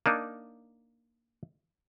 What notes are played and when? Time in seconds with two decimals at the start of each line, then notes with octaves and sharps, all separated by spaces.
0.06 A#3 D4 D#4